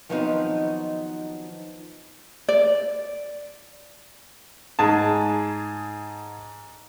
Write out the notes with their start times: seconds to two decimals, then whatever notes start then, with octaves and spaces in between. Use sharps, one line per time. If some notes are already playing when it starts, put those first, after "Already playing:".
0.09 D#3 F3 F#3 B3 C4 D#4
2.48 D5
4.79 G#2 G#4 A5